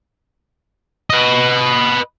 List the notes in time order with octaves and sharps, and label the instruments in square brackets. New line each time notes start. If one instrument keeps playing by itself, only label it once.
[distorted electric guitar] B4 D#5